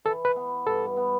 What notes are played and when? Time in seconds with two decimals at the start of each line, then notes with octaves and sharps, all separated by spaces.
0.05 E3 A4
0.25 B4
0.36 B3
0.66 G2 A4
0.97 B3